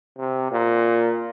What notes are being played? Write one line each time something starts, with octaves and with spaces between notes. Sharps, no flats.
C3
A#2